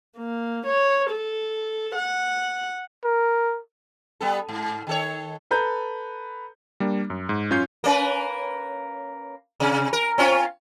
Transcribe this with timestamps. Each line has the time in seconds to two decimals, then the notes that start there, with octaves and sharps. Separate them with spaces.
0.17 A#3
0.66 C#5
1.10 A4
1.95 F#5
3.04 A#4
4.21 G3 B3 A4
4.48 G#2
4.87 D#3 A4 C#5
5.51 A4 B4 A#5 G6
6.80 G3 A#3 D4
7.10 F#2
7.29 G#2
7.51 F#2 C#4 F4 C#5 G6 C7
7.84 A#3 C#4 B4
9.60 C3
9.93 A#4
10.18 C4 C#4 F4